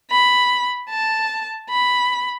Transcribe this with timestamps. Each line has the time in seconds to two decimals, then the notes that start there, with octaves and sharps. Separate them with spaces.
0.11 B5
0.90 A5
1.70 B5